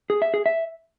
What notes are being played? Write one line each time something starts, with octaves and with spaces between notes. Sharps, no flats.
G#4
E5
G#4
E5